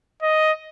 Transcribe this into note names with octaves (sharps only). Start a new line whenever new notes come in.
D#5